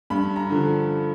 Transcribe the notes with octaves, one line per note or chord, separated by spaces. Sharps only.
G2 B5
A#5
D3 F3